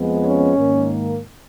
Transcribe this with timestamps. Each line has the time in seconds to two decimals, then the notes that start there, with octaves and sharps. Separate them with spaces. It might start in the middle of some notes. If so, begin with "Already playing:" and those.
Already playing: F2 F3 G#3 B3
0.25 C#4
0.57 G#2 D#3 A#3